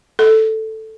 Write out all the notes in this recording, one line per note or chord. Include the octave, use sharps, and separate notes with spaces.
A4